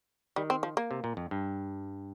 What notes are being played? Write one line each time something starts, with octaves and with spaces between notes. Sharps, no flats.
D#3 G3
C4
F3
A#3
C3
A#2
F2
G2